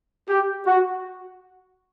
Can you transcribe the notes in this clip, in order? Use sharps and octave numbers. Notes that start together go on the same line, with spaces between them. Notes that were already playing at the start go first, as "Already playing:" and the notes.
G4
F#4